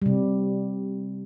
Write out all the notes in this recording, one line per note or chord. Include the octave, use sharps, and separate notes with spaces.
C3 G3